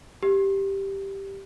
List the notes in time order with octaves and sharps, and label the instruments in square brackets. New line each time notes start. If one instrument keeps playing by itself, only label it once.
[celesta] G4